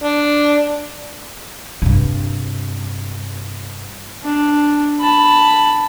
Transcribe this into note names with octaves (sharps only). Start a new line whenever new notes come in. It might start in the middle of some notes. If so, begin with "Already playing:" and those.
D4
G2 C3
D4
A5 B5